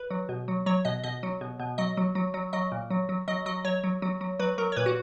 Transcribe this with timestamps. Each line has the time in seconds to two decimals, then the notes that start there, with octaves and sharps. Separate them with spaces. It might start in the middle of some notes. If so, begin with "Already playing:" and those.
Already playing: B4
0.10 F#3
0.29 B2
0.48 F#3
0.66 F#3 C#5
0.85 B2 D#5
1.04 B2 D#5
1.23 F#3
1.41 B2
1.60 B2
1.78 F#3 D#5
1.97 F#3
2.15 F#3
2.34 F#3
2.53 F#3 D#5
2.72 A#2
2.90 F#3
3.09 F#3
3.28 F#3 D#5
3.46 F#3 D#5
3.64 F#3 C#5
3.84 F#3
4.02 F#3
4.21 F#3
4.39 F#3 B4
4.58 F#3 A#4
4.72 C#5
4.76 A#2 B4
4.86 F#4